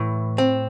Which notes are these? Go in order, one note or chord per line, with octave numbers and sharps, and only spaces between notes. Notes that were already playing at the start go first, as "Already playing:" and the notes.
Already playing: A2 E3
C4